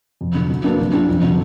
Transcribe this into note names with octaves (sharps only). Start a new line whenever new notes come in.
F2
D3 F#3
F#3
A#3 D4 F#4 B4
F#3
D4 F4
F2
D3 F#3